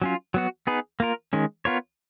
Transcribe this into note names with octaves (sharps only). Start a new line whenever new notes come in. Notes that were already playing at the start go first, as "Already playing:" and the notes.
F#3 C#4 F4
F#3 B3 F#4
B3 D#4 G#4 B4
A#3 F4 A#4
D#3 G#3 C#4
B3 F4 A#4 C#5